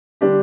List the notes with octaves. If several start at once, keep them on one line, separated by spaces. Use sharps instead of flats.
D3 G3 D4 G4